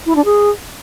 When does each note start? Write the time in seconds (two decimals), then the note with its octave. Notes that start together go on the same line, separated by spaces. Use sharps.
0.06 E4
0.15 D4
0.24 G#4